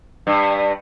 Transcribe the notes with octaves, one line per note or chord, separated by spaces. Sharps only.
G2